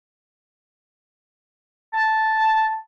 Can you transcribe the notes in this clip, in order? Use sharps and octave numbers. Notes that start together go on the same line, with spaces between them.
A5